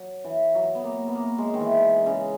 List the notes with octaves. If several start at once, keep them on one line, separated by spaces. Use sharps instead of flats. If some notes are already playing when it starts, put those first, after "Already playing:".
Already playing: F#3
E3
F#3
B3
A#3
B3
A#3
G#3
D#3
E3
C#3